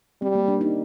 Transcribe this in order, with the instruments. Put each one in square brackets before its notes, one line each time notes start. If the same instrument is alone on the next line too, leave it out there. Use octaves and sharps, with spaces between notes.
[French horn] G3 [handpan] C4
[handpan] A#3
D4
D#4